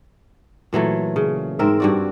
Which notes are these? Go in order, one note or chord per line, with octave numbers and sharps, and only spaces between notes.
A#2 E3 F#3 A3
C#3
G#2 C4 A#4 E5
G2 F#4 D5